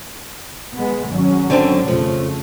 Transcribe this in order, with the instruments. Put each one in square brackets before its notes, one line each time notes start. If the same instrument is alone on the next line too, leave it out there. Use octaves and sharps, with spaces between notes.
[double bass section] G#3 B3
G#1 F#3 C#4
[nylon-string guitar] D3 C4 D4
[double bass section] F2 C#3 A3 [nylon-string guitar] F3